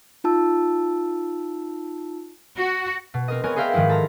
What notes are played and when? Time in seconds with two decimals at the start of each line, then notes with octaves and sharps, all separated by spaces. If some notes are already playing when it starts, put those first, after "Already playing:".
0.24 D#4 F4 A5 E6
2.57 F#4
3.14 B2
3.28 C4 A#4 D#5
3.44 B3 C4 A#4 C#5 G#5
3.56 G#4 A#4 C5 E5 F5 G5
3.73 G#2 D#3 F3 G#3 E4
3.89 A4 A#5